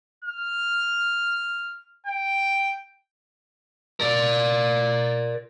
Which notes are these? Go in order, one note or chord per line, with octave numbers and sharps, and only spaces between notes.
F6
G5
A#4 D5